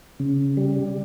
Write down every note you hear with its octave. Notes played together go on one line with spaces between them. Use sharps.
C#3
G3